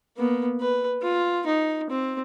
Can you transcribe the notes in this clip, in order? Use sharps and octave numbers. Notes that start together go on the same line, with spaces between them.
A#3 B3
B4
F4
D#4
C4